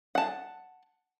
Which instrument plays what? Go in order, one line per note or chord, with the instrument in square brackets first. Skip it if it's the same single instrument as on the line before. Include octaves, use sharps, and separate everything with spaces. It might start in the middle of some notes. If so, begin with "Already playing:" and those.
[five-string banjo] F#5 A5